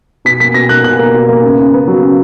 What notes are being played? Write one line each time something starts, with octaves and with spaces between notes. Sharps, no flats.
B2 B6
A#3 B6
B2 A#6
A#3 F#6
B2 F#6
A#3
B2
A#3
C#3
C#3
B3
F#3
C#3